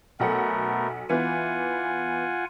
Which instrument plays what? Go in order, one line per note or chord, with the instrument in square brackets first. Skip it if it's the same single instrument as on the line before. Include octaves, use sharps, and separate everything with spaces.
[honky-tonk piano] B1 A4 F#5 [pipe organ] A3 B3 A#4
[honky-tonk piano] E3 B3 [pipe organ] F4 F#5 G#5